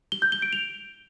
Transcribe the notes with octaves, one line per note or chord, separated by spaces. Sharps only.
G7
G6
G7
D7
F7